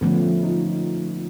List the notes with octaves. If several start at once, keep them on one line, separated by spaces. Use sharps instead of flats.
D3 F3 A3 B3 C#4
D#4 F4